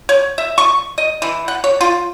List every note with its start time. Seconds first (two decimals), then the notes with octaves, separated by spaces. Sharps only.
0.09 C#5
0.38 E5
0.58 C#6
0.98 D#5
1.22 E3
1.48 F#5
1.64 C#5
1.81 F4